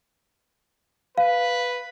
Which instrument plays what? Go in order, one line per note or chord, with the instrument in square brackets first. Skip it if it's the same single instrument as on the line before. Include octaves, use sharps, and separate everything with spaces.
[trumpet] B4 [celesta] F5